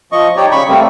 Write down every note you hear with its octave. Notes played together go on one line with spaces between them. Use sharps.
F3 D#5 C#6
D#4 G4 C#5 D5
C#3 B5 C#6
G3 A3 A#3 C4